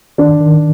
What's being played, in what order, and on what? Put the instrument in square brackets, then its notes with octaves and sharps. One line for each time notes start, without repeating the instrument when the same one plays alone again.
[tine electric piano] D#3 [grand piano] D4
[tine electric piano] D#3